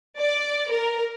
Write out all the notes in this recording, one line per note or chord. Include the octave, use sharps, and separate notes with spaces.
D5
A#4